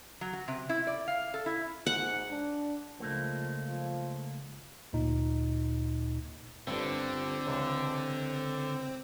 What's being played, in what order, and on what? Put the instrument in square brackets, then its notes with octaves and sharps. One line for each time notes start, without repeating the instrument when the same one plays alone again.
[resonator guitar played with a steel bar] F#3
F#4
C3
E4
D5
F5
A4
E4
[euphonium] G#2 [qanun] F#5
[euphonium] D4
[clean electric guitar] C#2 A3 A#3 [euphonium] F3
[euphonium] F3
[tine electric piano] D2 A#2 D#4
[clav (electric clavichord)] G1 G2 [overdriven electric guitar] D3 [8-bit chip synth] C4
[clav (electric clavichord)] C#2 C3 E3